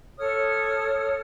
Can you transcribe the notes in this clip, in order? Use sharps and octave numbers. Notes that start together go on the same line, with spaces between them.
A4 C#5 D#6 F6